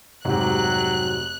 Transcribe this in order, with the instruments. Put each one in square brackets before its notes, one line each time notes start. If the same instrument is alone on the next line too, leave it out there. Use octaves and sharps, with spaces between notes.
[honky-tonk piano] F1 [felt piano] G#2 G4 [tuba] F#3 [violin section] F#6